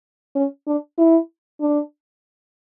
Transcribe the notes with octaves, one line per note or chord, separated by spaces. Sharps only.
C#4
D4
E4
D4